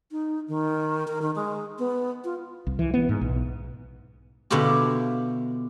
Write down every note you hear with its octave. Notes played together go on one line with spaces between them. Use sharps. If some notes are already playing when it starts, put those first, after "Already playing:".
D#4
D#3
A#4
D#3
G#3
B3
F4
C2
E3
B3
G#2
B1
B2 D3 E4 F4 G4